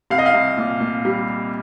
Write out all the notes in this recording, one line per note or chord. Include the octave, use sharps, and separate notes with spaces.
C2 F5
D#5
F5
C2
A#2
A#2
G3